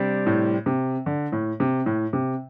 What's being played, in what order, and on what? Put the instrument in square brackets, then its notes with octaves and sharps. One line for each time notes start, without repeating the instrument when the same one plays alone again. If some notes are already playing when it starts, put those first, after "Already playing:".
Already playing: [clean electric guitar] C3 G3 D4
[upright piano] A2
C3
D3
A2
C3
A2
C3